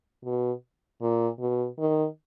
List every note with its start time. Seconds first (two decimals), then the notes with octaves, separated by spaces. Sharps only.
0.25 B2
1.01 A#2
1.40 B2
1.79 D#3